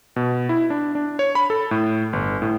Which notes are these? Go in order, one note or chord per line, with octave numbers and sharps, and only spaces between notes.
B2
E4
D4
D4
C#5
B5
A4
A2
G1
A2